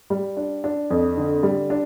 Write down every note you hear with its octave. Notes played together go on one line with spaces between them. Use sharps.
G3
D4
D4
F2
D3
G3
D4